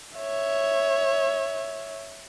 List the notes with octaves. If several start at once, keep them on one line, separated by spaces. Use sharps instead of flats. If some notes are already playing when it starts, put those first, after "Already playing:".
C#5 E5